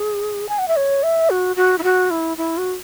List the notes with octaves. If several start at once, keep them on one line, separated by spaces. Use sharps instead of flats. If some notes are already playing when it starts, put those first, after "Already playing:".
Already playing: G#4
G#5
F#5
E5
C#5
E5
F#4
F#4
E4
F#4
E4
E4
F#4